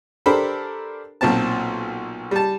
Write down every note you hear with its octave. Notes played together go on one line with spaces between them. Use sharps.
D4 G4 A4 A#4 C5 B5
B1 A#2 C4 A5
G3 A5